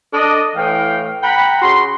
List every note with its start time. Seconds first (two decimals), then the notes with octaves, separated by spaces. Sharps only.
0.14 D4 A4 D#5
0.56 A2 E3 F5 G5
1.23 F#5 G5 A#5 B5
1.62 C#3 F#4 C6